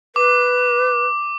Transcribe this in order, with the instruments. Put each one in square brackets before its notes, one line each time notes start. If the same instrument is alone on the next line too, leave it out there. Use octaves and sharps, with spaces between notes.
[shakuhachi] B4 [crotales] D6